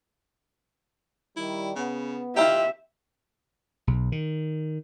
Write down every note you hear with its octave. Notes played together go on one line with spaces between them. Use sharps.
D#3 G3 E4
C#3 B3
D#3 E4 F4 G4 E5
B1
D#3